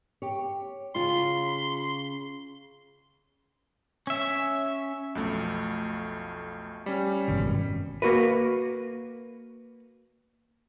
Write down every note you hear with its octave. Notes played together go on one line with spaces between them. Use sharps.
G4 C#5
C#3 F4 C6
C#4 E5
B1 F2 A3
G3 C#4
G#1 F#2 B2
A#3 F#4 A#4 B4